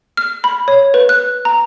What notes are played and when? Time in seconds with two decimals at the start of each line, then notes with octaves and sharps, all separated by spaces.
0.17 F6
0.44 B5
0.68 C#5
0.94 B4
1.09 F#6
1.45 A#5